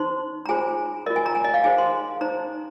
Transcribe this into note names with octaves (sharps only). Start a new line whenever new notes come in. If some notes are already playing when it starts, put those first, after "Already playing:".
Already playing: D#4 C5 C6
A#5
F4 G#4 C5 G#5
F4 A#4 D#5
G#5
A#5
G#5
D#5
F5
D#4 G#4 C5 G#5
C6
D#4 C5 A#5